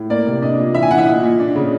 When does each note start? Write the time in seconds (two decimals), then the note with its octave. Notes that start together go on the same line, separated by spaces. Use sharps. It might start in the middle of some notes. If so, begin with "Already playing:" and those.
Already playing: A2
0.10 A#3 D5
0.26 C3
0.42 D4 D#5
0.58 A#2
0.74 E3 E5
0.82 G#5
0.91 E3 F#5
0.98 E5
1.06 A#2 D#5
1.23 A#2
1.39 D4
1.55 C#3